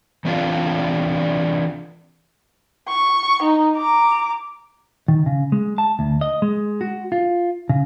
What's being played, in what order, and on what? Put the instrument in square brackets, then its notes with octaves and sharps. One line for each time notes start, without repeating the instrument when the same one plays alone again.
[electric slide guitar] E3 C4 D4 F4 D5 F5
[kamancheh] C#6
D#4
A#5 D6
[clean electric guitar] D#3
C#3
G#3
A5
D2
D#5
G#3
F#4
F4
C#3